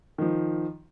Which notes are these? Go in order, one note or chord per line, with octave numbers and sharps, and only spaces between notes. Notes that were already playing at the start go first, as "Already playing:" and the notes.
D#3 F3